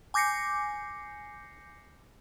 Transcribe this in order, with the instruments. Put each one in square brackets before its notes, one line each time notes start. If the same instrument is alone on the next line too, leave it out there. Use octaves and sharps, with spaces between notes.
[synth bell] G#5 D6 G6 A#6 C7 C#7